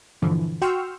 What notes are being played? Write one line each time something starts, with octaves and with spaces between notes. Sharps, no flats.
G2 A#2 D3 E3 F3
F#4 G5 C6 C#6 E6 F6